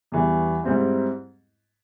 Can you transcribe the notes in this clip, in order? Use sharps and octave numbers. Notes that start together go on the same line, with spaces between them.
E2 E3 G3
G#2 G3 C4 E4